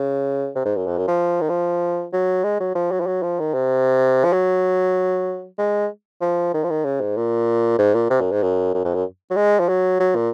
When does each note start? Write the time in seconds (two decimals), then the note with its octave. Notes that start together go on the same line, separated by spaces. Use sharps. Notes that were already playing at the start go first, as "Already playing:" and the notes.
Already playing: C#3
0.55 C3
0.65 G#2
0.77 F#2
0.87 F2
0.98 F#2
1.08 F3
1.41 D#3
1.50 F3
2.13 F#3
2.44 G#3
2.60 F#3
2.75 F3
2.91 F#3
3.00 F3
3.07 F#3
3.23 F3
3.39 D#3
3.54 C3
4.25 F3
4.33 F#3
5.58 G#3
6.21 F3
6.54 D#3
6.64 F3
6.70 D#3
6.85 C#3
7.01 G#2
7.17 A#2
7.79 G#2
7.95 A#2
8.10 C3
8.21 F#2
8.32 G#2
8.43 F#2
8.74 F#2
8.85 F2
8.94 F#2
9.31 F#3
9.36 G#3
9.60 F3
9.69 F#3
10.00 F#3
10.16 A#2